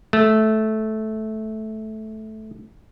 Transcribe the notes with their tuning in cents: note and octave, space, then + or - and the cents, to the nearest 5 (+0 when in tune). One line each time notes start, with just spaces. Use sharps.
A3 -10